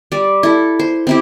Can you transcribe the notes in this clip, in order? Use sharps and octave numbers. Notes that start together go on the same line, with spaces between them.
G3 D5
E4 A4
C5
C4 E4 G4